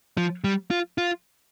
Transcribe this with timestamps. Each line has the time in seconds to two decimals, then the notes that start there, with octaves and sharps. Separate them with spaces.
0.17 F3
0.44 G3
0.71 F4
0.98 F4